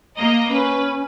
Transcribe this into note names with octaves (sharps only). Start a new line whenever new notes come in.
A#3 D#5 A#5
C#4 B4